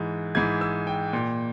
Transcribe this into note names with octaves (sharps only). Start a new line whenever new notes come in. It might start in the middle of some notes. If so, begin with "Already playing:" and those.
Already playing: G#2 E3
G#2 E3 G#6
E6
G5
A#2